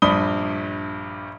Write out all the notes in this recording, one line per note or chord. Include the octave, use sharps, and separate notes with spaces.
A#1 G2 D4 B5 D#6 G7